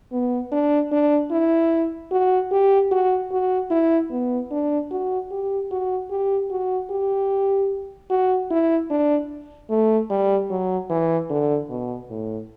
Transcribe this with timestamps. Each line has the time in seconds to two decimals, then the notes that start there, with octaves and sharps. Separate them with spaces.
0.12 B3
0.52 D4
0.92 D4
1.31 E4
2.12 F#4
2.52 G4
2.91 F#4
3.31 F#4
3.71 E4
4.11 B3
4.51 D4
4.91 F#4
5.31 G4
5.71 F#4
6.11 G4
6.51 F#4
6.90 G4
8.10 F#4
8.51 E4
8.90 D4
9.70 A3
10.10 G3
10.50 F#3
10.90 E3
11.30 D3
11.70 B2
12.10 A2